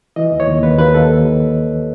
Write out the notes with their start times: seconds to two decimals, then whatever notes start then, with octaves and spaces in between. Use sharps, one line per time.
0.16 E3 D#5
0.32 D#2
0.40 C#5
0.47 D#2
0.63 D#2 B4
0.78 D#2 B4
0.94 D#2 A4